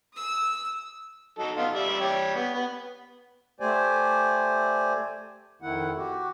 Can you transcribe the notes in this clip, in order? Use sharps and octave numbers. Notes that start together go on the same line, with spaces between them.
D#6 E6
F#3 D#4 A4
B3 D#4 F4
G3 D5 E5
G3 G4 C#5
B3
B3
A3 G4 C5 D5 G#5
F2 D#3 E4 F#5
F#4 G4